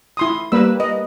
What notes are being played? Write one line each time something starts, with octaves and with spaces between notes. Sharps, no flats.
E4 C6 D#6
G3 A#3 B4 E6
D#5